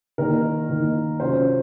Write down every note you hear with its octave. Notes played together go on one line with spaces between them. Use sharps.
D#3 A#3 D#4 A#4
D#3 A#3 D#4
C3 F#3 C#4 F4 C5